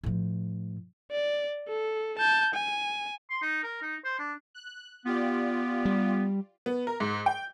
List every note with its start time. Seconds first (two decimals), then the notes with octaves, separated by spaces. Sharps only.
0.03 A2 F3
1.11 D5
1.68 A4
2.18 A5 G6
2.54 G#5
3.30 C6
3.42 D#4
3.64 A#4
3.82 D#4
4.04 C5
4.19 D4
4.55 F#6
5.05 B3 F4 G4 D5
5.85 G3
6.66 B3
6.87 A#4
7.00 G#2
7.26 G5